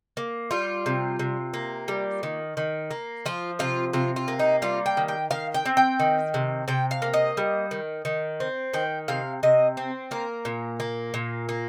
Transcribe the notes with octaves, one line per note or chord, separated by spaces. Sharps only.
A#3
G3 F4
C3
C3
A#3
G3
D#3
D#3
A#3
F3 F4
C3 F4
C3 F4
F4
A#3
D#4
G3 F4
G5
D#3
G5
D#3 F5
G5
C4
G5
D#3
C3
C3 G5
F5
A#3
D#5
G3
D#3
D#3
C4
D#3 G5
C3 F5
C3 D#5
C4
A#3 A#4
A#2
A#3
A#2
A#3